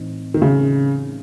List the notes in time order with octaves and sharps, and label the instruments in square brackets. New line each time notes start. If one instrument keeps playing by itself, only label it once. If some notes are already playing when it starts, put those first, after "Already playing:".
Already playing: [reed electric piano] A2 E3 C4 D#4
[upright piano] D#3
C#3